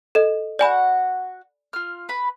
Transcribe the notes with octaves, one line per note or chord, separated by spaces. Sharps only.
A4 D#5
F#4 D5 F#5 G#5 B5
F4 F6
B4 B5